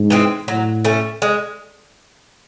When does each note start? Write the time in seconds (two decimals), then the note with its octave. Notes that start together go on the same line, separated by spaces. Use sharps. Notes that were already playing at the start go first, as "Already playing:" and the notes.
Already playing: G#2
0.10 E3 G#3 C4
0.48 A2 F#3
0.85 A3 C#4
1.22 G#3